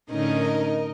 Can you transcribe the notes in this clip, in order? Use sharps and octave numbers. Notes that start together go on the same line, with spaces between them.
A2 D3 C#4 D#4 A#4 D#5